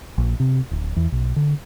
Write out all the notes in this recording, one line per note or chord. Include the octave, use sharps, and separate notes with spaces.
A#1
C3
D1
E2
B1
D3